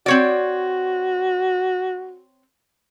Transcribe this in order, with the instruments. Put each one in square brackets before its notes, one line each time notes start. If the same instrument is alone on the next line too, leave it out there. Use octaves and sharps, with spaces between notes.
[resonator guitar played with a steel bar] C4 C#5 D5 [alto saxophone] F#4